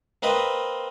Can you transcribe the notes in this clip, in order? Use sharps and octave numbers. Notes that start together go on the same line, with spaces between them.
A#3 C4 B4 D#5